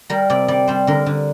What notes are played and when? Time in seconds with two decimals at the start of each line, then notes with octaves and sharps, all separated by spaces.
0.10 G3 A#4
0.30 C3 D5
0.48 G3 D5
0.67 G3 C5
0.87 D3 A#4
1.06 D3